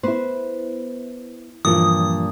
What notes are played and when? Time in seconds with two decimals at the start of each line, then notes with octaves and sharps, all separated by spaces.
0.03 B3 E4 B4 C5
1.65 G2 A#2 E3 F3 D#6